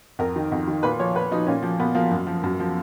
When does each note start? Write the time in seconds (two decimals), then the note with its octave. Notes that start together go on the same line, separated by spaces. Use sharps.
0.19 F2 A#4
0.36 D#3
0.52 F2
0.68 D#3
0.83 A#2 B4
0.99 F3 C#5
1.16 A#2 B4
1.31 F3 D#4
1.47 A#2 C#4
1.63 F3
1.80 A#2 B3
1.95 F3 A#3
2.11 F#2
2.27 F3
2.43 F#2
2.60 F3